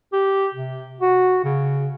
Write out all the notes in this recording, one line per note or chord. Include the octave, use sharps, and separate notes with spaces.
G4
C3
F#4
C#3